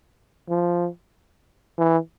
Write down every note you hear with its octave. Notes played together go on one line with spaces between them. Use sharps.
F3
E3